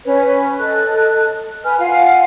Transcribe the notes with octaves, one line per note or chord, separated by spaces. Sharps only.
C#4 B4 C#5
A4 D#5 F#6
B4 G#5 F6
F4 F5 F#5 G#5